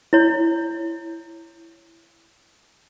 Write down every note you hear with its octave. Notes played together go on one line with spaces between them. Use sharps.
E4 C#5